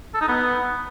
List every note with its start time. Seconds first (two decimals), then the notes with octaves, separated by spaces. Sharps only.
0.14 A4
0.21 D#4
0.28 B3